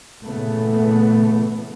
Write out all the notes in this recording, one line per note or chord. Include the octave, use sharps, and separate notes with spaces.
A#2 C#3 E3 A3 B3